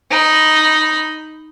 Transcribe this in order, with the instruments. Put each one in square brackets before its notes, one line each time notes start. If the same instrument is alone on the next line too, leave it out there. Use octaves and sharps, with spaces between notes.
[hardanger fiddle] D#4 B5